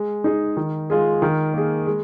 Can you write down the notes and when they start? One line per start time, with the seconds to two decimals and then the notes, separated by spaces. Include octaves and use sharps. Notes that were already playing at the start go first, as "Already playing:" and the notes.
Already playing: G#3
0.24 D#4 G#4
0.57 D#3
0.90 G#3 F4 G#4
1.22 D#3
1.54 A#3 G#4
1.87 G#3